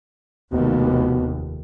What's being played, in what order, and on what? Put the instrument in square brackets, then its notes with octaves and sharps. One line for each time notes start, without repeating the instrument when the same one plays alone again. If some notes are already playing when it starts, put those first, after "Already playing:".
[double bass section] F1 D#2 [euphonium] B2